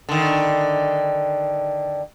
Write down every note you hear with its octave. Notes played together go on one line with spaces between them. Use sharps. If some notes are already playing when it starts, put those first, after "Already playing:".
D3 D#3